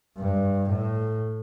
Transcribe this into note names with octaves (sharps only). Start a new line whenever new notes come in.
G2
A2